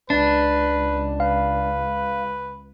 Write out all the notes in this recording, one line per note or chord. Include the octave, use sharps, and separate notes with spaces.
C#2 D4 B4
B4 F5